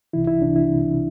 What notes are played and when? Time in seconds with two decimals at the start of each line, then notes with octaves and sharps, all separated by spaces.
0.13 C2 C3 E3 E4
0.27 E4
0.42 C2 C3 E3 D4
0.56 E4
0.70 C2 C3 E3